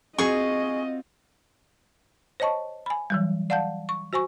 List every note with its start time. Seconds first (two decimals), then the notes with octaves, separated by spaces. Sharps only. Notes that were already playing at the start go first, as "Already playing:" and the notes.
0.18 C4 F4 F#4 G#4 D#5 C#6
2.40 C5 C#5 D#5 A5 C#6
2.86 G#5 B5
3.10 E3 F#3 G3
3.50 D5 F5 F#5 A5 G6
3.89 C#6
4.13 F#4 C5 G#5 C#6